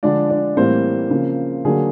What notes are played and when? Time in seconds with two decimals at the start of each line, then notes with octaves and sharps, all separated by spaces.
0.03 D3 F3 G#3 D4 D5
0.30 D4 D5
0.57 A2 E3 G3 A#3 C4 C5
1.10 C#3 F3 A#3
1.65 D3 F#3 A#3 G#4